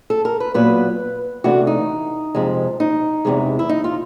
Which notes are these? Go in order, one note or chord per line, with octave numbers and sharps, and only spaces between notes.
A4
A#4
B4
A#2 F#3 B3 B4
C3 E3 A3 D4 F#4
D#4
F2 C3 F3 G#3
D#4
E2 C3 E3 G#3
E4
D#4
F4